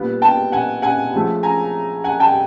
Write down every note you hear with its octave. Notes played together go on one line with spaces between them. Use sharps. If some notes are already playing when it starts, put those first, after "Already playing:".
Already playing: A#2 G3 B3
G5 A5
F#5 G#5
F#5 G#5
C#3 F3 A3
G#5 A#5
F#5 G#5
G5 A5